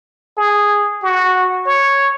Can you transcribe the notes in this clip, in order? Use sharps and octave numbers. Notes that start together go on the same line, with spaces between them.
G#4
F#4
C#5